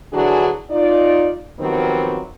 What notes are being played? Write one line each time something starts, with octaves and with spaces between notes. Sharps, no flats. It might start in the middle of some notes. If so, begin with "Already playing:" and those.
D3 E3 F#3 D4 F#4 G#4
D#4 F4 D5
D#3 F3 F#3 B3 C4 G4